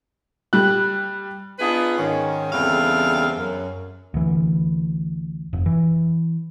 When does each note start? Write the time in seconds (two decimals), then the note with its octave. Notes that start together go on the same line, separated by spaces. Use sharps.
0.53 G3 F#6
1.59 B3 D4 D#4 F4 G#4 B4
1.98 G#2 D#3 C#4
2.52 E2 C#3 G3 C4 A4 F5
3.36 F#2
4.14 D2 E3
5.53 F1
5.66 E3